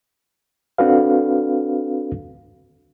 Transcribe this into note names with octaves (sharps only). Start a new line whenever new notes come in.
C4 D4 F#4 A4 B4 F5